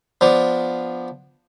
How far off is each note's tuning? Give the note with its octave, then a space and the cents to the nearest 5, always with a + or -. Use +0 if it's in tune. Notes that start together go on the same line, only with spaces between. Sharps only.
F3 +0 B3 +0 D4 +0